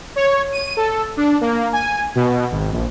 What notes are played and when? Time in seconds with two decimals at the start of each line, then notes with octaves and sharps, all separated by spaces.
0.16 C#5
0.53 D#7
0.77 A4
1.17 D4
1.41 A#3
1.73 G#5
2.15 B2
2.51 G#1
2.72 A#1